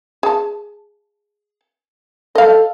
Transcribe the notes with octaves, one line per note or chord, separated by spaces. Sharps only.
G#4 A5
A4 D#5 F5